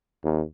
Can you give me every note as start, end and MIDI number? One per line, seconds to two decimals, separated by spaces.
0.24 0.43 39